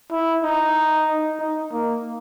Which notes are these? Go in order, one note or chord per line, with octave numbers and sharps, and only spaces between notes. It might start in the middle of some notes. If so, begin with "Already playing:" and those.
E4
D#4
D#4
A#3